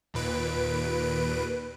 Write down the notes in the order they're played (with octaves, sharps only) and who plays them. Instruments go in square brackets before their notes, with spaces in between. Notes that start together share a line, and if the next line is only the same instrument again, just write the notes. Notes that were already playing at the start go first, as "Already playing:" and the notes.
[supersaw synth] D#2 A#2 B4 D7